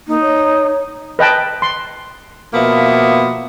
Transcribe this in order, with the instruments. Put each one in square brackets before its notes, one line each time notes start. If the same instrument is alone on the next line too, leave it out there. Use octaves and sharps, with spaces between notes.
[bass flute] A#3 [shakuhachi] D#4
[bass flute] C#5
[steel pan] B4 D#5 G5 A5
C6
[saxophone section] B2 F3 A#3 B3 E5